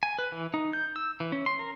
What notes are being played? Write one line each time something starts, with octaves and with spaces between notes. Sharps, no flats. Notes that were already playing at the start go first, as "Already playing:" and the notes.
G#5
B4
E3
D#4
G6
E6
E3
C#4
C6
A#4